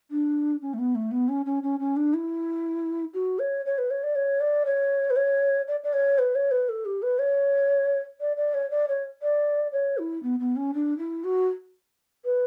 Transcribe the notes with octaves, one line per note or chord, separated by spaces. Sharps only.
D4
C#4
A3
B3
A3
B3
C#4
C#4
C#4
C#4
D4
E4
F#4
C#5
C#5
B4
C#5
D5
C#5
D5
C#5
B4
C#5
D5
D5
C#5
B4
C#5
B4
A4
G4
B4
C#5
D5
D5
C#5
D5
C#5
D5
C#5
E4
B3
B3
C#4
D4
E4
F#4
B4